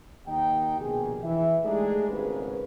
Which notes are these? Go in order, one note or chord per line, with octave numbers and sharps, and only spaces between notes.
D#2 D#4 G5
A#1 B2 D#3 G4 G#4
E3 E5
G#3 A3 D4 D#4 G4 G#4
G#1 C#2 G#2 C#3 B4